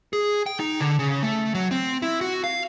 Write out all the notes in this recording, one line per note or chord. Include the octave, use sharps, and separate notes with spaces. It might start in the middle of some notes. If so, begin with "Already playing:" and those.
G#4
G5
D#4
D3
C#3
A3
F#3
C4
E4
F#4
F5